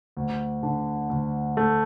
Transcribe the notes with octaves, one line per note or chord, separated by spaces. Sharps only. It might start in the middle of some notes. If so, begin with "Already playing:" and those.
D2
D3
D2
A3